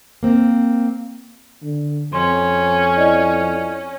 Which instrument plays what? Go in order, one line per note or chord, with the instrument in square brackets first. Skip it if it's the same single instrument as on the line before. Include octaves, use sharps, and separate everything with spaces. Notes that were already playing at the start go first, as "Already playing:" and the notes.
[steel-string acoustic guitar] A#3 C4
[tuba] D3
[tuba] F2 [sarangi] C#4 [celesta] C6
[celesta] E4 D5 D#5